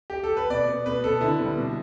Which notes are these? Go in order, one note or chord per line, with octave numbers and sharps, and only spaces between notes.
G4
A4
B4
B2 D5
B3
B2 B4
B3 A4
D3 E4
G3 B3
B2